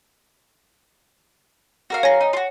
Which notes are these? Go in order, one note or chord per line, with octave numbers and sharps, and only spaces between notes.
F#4 A#4 F5
C#5 G#5 A#6
D#4
F4 F#4